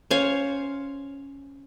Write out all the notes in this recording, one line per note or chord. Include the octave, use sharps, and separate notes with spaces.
C#4 C5 C#5 F5